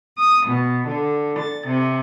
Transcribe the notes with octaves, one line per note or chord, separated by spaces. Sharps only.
D#6
B2
D3
A6
C3